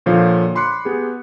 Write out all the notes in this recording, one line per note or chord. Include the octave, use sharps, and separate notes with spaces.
A#2 D3 F3 C#5 F5
B5 C6 D6 F#6 C#7
B3 G4 G#4